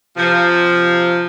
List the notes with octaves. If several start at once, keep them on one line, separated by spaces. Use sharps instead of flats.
C3 F3